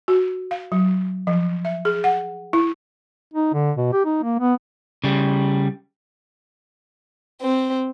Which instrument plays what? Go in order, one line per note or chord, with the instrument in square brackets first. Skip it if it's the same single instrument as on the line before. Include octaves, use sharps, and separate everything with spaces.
[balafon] F#4
F5
F#3
F3
E5
G#4
F#5
E4
[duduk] D#4
D3
B2
G4
D#4
A#3
B3
[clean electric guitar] C#3 G3
[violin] C4